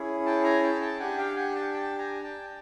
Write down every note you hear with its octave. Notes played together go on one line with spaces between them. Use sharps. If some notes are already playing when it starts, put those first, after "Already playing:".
Already playing: C#4 E4 G#4
G5 A5
G#5 A#5
G5 A5
G5 A5
D4 G4 F#5 G#5
F5 G5
F#5 G#5
G5 A5
G5 A5
G#5 A#5
G5 A5